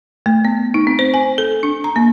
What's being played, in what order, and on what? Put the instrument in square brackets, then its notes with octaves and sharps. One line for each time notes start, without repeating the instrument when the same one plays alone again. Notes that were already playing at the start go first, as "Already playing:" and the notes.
[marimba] A3
B3
D#4
C4
C5
G#5
A4
D4
A#5
A#3